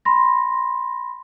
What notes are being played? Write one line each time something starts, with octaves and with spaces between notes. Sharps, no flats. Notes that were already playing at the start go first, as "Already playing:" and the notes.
B5 C6 A#6